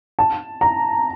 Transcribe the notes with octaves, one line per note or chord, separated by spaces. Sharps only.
A5
A#5